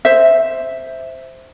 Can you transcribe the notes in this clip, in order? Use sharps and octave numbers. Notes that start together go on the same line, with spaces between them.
C5 E5